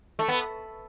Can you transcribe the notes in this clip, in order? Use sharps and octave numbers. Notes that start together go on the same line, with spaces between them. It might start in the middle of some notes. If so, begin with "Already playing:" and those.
A3
B3